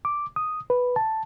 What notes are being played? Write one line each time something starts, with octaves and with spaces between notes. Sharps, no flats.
D6
D#6
B4
A5